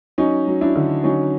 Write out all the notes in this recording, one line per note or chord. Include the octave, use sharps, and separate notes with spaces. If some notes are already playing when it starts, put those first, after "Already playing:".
F#3 C#4 D#4
F#3
D4 E4
D3
F#3 C#4 D#4